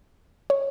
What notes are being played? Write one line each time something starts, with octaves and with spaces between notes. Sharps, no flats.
C#5